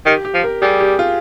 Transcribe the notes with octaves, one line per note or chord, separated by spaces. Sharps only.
D#3 G4
G4
F3
A#4
G3 G#4
G4
F4